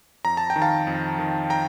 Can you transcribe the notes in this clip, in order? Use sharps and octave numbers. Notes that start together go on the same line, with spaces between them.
F2 A#5
A5
G5
D#3
F5 A5
F2
D#3
G5 A#5